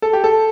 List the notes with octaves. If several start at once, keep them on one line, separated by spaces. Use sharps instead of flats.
A4
G4
A4